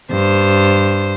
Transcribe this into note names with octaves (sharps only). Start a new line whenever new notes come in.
G2 C5